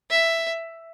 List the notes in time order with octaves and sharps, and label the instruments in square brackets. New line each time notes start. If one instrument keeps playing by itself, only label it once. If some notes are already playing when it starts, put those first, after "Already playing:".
[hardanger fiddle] E5